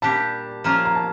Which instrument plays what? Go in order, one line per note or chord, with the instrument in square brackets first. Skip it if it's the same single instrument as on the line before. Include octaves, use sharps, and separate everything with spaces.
[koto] A#2 G3 D4 G4 [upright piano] A5
[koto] F3 A#3 C#4 F4 [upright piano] A#5
[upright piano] A#5
A5